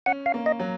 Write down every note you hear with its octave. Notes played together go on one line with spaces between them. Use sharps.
C#4 F#5
F5
A#3
D#5
F#3